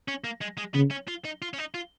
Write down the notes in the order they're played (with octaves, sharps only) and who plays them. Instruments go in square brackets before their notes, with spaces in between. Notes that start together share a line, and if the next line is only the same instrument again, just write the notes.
[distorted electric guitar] C#4
A#3
G#3
G#3
[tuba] C#3 [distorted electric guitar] B3
[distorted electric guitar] C#4
F4
D#4
F4
C#4
D#4
F4